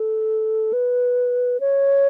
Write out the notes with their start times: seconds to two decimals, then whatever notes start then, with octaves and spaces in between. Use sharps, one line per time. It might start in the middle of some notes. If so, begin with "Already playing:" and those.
Already playing: A4
0.73 B4
1.60 C#5